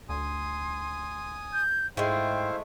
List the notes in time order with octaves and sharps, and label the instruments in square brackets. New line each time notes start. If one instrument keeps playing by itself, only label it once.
[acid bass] D2 [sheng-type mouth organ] G#5 D#6 [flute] C6
[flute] G6
[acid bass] G#2 [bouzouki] G#3 A3 [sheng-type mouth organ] E4 C5 F5 [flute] G5